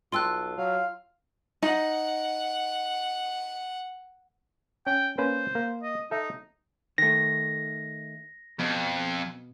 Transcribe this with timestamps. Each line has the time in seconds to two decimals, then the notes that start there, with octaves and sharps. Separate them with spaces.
0.12 B1 F4 G5 A5 C6 E6 F#6
0.57 F#3 F5
1.62 D#4 F#5
4.87 C#4 G5
5.18 A#3 C#4 B4 C5
5.55 A#3
5.83 D#5
6.11 D#4 A4 E5
6.98 D#3 A3 A#6
8.59 F2 B2